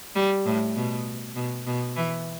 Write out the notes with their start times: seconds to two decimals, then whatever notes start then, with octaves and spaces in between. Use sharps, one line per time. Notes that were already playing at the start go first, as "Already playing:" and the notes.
0.15 G3
0.45 A2
0.76 B2
1.36 B2
1.67 B2
1.96 E3